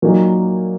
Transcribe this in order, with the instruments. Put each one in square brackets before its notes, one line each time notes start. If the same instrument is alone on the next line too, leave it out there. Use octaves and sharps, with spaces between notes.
[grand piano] A#2 F#3 A#3 D#4